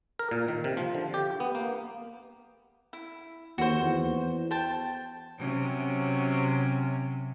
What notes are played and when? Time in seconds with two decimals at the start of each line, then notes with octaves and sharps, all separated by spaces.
0.19 A#4
0.31 A#2
0.48 D#3
0.64 C3
0.77 F3
0.95 D3
1.14 G4
1.40 B3
1.55 A#3
2.93 E4
3.58 D#2 F#4 C5
3.82 E2
4.51 C5 G5 A5
5.38 C3 F#3 C#4